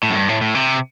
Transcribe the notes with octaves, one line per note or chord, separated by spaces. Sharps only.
A2
F#2
G2
A2
A2
C3